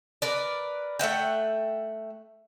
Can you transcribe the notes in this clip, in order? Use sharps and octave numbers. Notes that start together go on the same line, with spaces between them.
A#4 B4 D5
A3 E5 F#5 G5